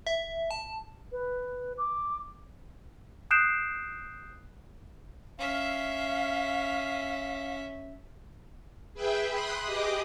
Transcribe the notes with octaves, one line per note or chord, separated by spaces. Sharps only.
E5
A5
B4
D6
D#6 F#6 G6 C7 D7 E7
C#4 E5 F5
G#4 B4 E5 G5
B5 C6 D#6 F#6
G4 G#4 D#5 D6 D#6